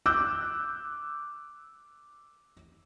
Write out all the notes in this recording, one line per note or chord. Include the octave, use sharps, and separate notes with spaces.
D6 E6 F#6 G6